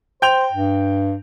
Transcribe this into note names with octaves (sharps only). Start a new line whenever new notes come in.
C5 G5 G6 F7
G2